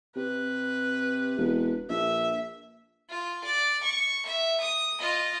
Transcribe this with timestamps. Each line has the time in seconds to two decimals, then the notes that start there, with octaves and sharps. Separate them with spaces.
0.16 C3 B4
1.38 E1
1.89 A#1 E5
3.10 F4
3.45 D5
3.84 C#6
4.26 E5
4.61 D#6
5.00 F4 D#5